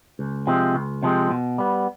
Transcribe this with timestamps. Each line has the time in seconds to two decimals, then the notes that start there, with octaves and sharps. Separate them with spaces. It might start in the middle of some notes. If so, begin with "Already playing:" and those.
0.19 C#2
0.47 C3 F3 G#3 C4
0.75 C#2
1.03 C3 F3 G#3 C4
1.31 B2
1.58 G3 B3